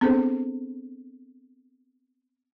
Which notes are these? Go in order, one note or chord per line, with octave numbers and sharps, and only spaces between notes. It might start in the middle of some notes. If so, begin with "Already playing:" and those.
B3 C4 D4 G#4 A4 C5